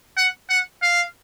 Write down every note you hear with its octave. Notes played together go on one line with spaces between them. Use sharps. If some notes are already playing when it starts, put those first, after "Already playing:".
F#5
F#5
F5